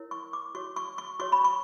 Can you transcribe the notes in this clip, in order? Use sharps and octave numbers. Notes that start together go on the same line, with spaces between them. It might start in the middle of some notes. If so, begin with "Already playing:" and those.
Already playing: E4 A#4 C#5
C#6
D6
F#4 C#5 C#6
C#6
C#6
F#4 C#5 C#6
B5
C#6